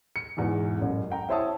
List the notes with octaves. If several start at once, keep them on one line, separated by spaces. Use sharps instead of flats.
C#7
E2 G#2 B2 E3
A1 F#2
F#5 G5 A#5
E4 C5 C#5 E5 A5 D#6